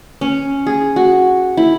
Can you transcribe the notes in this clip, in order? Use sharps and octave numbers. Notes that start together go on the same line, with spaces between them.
C#4
G#4
F#4
E4